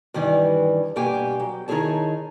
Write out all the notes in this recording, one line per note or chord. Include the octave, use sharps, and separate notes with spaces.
G2 D#3 E3 G3
G2 B2 A#3 G4 G5 G#5
F#3
D#3 D#4 E4 G#4 C#5 A5